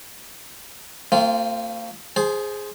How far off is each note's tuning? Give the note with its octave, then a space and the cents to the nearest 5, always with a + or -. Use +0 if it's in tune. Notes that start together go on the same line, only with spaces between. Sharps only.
A3 +45 C4 +0 F4 -10
G#4 +0 C5 +0 A5 -45